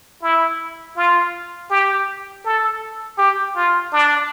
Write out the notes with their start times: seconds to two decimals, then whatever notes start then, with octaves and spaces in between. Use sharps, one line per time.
0.22 E4
0.96 F4
1.70 G4
2.45 A4
3.18 G4
3.56 F4
3.93 D4